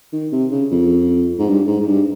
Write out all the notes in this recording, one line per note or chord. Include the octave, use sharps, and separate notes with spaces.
D#3
C3
C#3
F2
G#2
G2
G#2
G#2
G2